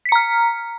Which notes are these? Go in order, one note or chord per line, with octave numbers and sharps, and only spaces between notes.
A#5 F6 B6 C#7